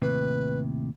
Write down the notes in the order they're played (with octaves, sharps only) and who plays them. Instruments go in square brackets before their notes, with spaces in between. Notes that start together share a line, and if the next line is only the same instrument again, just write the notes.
[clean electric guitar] D#2 A2 C3 [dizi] B4